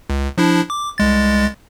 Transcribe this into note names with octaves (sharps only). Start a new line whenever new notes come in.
C#2
F3 D4 E4
D6
C2 G#3 A6